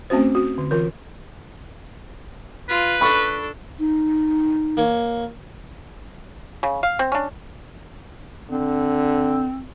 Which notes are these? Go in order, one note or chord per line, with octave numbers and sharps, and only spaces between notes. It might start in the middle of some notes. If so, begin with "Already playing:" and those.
A3 C4 C#4 F#4 C5
F#4
D3
E3 F4 A#4
F4 B4
D4 A4 B5 C#6
D#4
A#3 C#5
C#3
F5
C4
C#4 D4
D3 C4